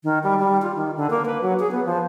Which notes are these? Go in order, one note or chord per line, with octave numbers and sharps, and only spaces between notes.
D#3
G3
G3
F4
D#3
D3
A#3
B4
F#3
G#4
B3
F3